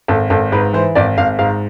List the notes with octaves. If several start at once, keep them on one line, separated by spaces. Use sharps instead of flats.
G#1 A4
G#1 A4
G#2 B4
E3 C5
G#1 D5
G#1 F5
G#2 F5